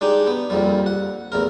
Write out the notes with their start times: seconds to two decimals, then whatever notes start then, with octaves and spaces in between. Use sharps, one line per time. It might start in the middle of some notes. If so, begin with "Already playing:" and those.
0.01 G#3 D4 D#4 G4
0.27 B3
0.50 A#1 F2 G3
0.86 F#5
1.32 A1 E2 A#4